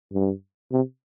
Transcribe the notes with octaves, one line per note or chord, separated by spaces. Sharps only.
G2
C3